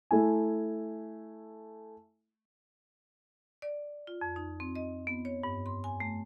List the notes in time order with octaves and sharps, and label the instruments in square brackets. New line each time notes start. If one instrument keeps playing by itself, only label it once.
[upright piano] A3 E4 G#5
[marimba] D5
F4
F2
D#4
C4
D#5
B3
C#5
G2
C6
G#5
A3